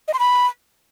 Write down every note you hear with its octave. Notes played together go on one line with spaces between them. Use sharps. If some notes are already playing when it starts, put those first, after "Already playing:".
D#5
C6
B5